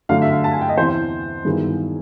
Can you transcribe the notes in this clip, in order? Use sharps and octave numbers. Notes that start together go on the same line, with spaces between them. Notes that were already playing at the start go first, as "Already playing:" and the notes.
D3 F#3 A3 D4 F5
E5
F5
A5
G#5
G5
D#5
E2 C3 E3 C5
G2 D#3 F#3 B3 E4 G#4